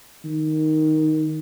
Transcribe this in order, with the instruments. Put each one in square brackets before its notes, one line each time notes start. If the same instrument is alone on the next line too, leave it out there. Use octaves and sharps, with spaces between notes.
[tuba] D#3